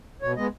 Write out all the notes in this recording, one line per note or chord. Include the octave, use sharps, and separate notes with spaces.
B2 C#5
G#3 B3 D#5